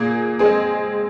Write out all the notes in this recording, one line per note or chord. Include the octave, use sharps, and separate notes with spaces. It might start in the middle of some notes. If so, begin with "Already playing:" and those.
Already playing: A#2 A#3 G#4
G#3 C4 G#4